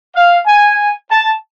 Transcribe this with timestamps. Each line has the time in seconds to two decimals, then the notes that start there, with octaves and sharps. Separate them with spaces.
0.15 F5
0.46 G#5
1.10 A5